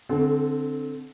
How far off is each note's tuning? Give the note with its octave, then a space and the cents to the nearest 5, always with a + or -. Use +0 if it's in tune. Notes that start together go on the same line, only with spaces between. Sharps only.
D3 +0 C4 +0 A4 -35